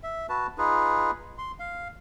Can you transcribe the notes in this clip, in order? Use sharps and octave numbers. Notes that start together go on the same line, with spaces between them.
E5
F#4 B4 A5
D#4 F4 G#4 B4
C6
F5